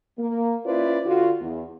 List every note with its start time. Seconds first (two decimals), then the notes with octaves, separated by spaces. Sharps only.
0.18 A#3
0.65 C#4 E4 F4 B4 C5 D5
1.06 D3 F4 F#4
1.41 E2